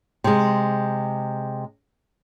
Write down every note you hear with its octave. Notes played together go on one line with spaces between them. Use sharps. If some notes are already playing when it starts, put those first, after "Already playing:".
C3 G#3